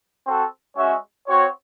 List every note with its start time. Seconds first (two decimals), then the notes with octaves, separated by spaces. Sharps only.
0.25 C4 F#4 A4
0.76 G#3 C#4 F#4 C#5 E5
1.28 C4 F#4 C#5